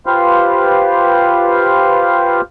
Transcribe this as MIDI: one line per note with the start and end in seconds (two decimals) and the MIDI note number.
0.06 2.41 65
0.06 2.41 67
0.06 2.41 71
0.06 2.41 72
0.06 2.41 77